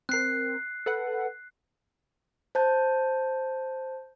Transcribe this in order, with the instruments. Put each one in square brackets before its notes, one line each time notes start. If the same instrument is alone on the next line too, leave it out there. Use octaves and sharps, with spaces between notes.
[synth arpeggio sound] C4 A#4 [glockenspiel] F#6 C7
[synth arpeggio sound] A4 B4 F#5
[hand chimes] C5 A5 G6